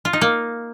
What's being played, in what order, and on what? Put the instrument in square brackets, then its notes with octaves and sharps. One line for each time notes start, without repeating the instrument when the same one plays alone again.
[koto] F4
D#4
A#3